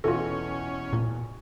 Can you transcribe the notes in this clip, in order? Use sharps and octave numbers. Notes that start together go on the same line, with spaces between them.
E2 B2 E3 C#4 F4 A4
A#2